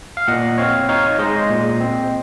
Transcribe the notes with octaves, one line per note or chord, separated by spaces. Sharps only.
F5
A#2 D#5 F#5
C4 C#5 F5
D#4 C#5 F5
G#3 C5 D#5
A#2
C4